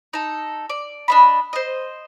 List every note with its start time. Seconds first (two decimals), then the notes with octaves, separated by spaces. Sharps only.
0.13 D#4 A4
0.70 D5
1.08 D4 D#5 B5
1.53 C5 D#5